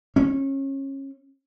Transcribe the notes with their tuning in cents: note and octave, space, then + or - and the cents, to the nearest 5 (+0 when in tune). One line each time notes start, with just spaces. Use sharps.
C#4 -25